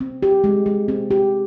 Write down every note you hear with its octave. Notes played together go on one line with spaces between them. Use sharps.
C4
G4
G#3
G#3
C4
G4